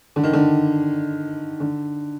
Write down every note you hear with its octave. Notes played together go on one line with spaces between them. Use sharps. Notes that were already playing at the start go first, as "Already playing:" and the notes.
D3
D#3
D3
D3